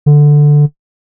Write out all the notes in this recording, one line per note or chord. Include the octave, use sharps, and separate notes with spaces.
D3